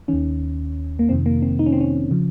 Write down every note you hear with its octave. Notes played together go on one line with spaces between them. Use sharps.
D#2 D#3 C#4
A#3
F2 C3 D#3 C4
A#3
C4
D#4
C#4
C4
C#4
C#3 F3